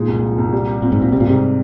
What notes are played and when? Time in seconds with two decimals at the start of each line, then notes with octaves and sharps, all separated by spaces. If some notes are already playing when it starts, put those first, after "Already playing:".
Already playing: A#2 G#3 D#4
0.08 C2
0.23 F3
0.38 C2
0.53 G3
0.67 G4
0.82 A#2 C4
0.92 G#2
0.97 A#2 C4
1.12 C3 G3
1.20 A#2
1.27 G#2 C3